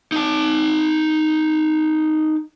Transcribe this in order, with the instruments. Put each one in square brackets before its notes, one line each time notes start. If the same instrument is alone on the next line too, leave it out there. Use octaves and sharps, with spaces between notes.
[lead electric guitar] D#4 A5